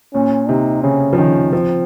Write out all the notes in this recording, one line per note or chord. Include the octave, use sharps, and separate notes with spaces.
A#2 C#4
C3 D#4
C#3 C#4
F3
D#3 C#4
F3 C4